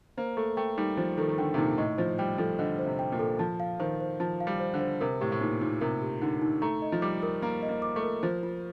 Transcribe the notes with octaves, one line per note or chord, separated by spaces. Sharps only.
A#3 C5
A3 A4
A3 G5
G3 D#4
F3 C5
D#3 A4
D#3
D3 G5
C3
A#2 D#4
A2 D#5
F3 C5
G3 G5
F3 A4
D3 D#5
C5
C3
G5
A#2
A4
F3 A5
F5
D#3 C5
C5
F3 A5
F5
G3
C5
D3
C5
C3 A#4
A2 G4
A2
A#2 D#4
A#2 D#4
C3 A#4
G4
D3 D#4
D#4
A3 A#5
D#5
F3
G3 D6
A#4
A#3 A#5
D#5
A#3
D6
A3
A#4
F3 C5
F4